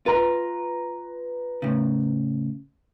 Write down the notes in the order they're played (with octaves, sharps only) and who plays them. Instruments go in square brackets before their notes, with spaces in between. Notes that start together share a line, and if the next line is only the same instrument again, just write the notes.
[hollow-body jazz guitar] F4 [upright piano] B4 A#5
[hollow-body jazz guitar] A2 C#3